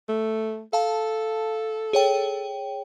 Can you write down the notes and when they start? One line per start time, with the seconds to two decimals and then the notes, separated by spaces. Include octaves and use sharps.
0.09 A3
0.73 A4 F5 A5
1.93 G#4 C#5 G5